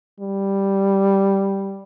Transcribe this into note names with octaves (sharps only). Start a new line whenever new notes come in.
G3